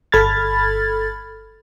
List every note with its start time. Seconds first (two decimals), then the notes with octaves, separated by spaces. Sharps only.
0.12 G1 A4 B5 F6 G#6 A6